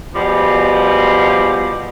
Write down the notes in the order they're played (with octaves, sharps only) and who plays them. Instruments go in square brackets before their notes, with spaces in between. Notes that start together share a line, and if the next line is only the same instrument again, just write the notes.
[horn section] B2 F3 G3 G#3